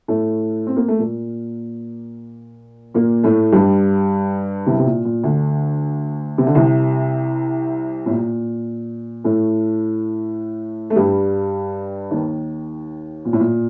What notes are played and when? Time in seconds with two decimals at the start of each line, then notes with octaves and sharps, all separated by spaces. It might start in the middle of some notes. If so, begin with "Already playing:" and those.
0.08 A2 A3
0.67 C4
0.76 A#3
0.88 A3
0.99 A#2 A#3
2.94 A#2 A#3
3.24 A2 A3
3.52 G2 G3
4.66 C2 C3
4.79 C3
4.85 A#2
5.05 A#2
5.23 D2 D3
6.38 C3
6.47 D3
6.55 C2 C3
8.06 A2
8.10 A#2
9.24 A2 A3
10.90 A3
10.96 G2 G3
12.11 D#2 D#3
13.25 A#2
13.33 A2
13.40 A#2